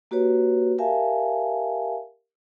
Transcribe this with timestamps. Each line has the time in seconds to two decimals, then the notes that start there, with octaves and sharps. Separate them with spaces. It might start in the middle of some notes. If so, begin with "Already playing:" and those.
0.11 A#3 F#4 G4 B4 C#5
0.78 G4 A#4 E5 F5 G#5 A5